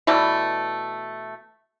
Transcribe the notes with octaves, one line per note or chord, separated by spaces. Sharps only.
B2 E3 A3 D5